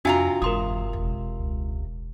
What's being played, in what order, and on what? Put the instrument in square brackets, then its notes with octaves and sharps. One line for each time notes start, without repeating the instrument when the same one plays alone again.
[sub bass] F2 [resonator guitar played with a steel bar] C3 F4 A#5 [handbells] D4 F#4 G#5
[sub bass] F#1 [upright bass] E2 G#2 [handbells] A#4 C6 D#6
[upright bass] E1
[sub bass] C#2